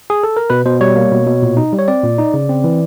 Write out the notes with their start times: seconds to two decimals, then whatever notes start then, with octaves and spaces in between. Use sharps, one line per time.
0.10 G#4
0.24 A4
0.37 A#4
0.50 B2 B4
0.65 B2 C5
0.81 G3 C#5
0.96 A#3
1.12 B2
1.26 B2
1.42 A#2
1.57 D#4
1.73 G3
1.79 C#5
1.88 C4 D5
2.04 A#2
2.18 D#4
2.34 C#3
2.49 C4
2.64 E3